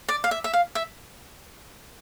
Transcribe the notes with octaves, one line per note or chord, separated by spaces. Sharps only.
D5
F5
E5
E5
F5
E5